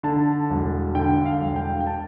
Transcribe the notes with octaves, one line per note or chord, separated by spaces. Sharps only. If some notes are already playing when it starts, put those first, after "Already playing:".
D3 A5
E1
D3 G5
F5
E1
G5
G5
A5